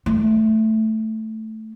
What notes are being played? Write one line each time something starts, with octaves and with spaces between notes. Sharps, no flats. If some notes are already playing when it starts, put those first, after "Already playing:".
A3